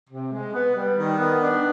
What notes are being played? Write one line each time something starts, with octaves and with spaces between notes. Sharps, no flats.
C3
G#3
B3
G3
D#3
B3
D4